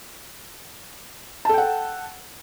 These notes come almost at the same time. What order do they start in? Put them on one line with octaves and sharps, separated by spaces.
A5 A4 G5 F#5